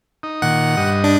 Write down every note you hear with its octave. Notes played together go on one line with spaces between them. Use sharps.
D#4
A#2 D#3 F#5
G2 D#5
D4